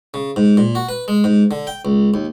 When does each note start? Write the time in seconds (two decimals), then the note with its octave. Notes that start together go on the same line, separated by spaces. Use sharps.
0.14 C#3
0.36 G#2
0.57 A#2
0.75 F#4
0.89 B4
1.08 G#3
1.24 G#2
1.51 D3
1.67 G5
1.85 C#2
2.14 D#2